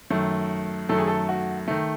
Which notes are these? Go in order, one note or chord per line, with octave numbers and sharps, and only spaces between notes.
F#2 D#3 A3
F#2 D#3 A3 A4
G#4
A4
F#4
D#3 A3